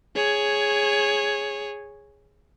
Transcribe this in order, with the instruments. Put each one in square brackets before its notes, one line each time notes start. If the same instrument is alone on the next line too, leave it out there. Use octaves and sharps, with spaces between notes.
[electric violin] G#4 C#5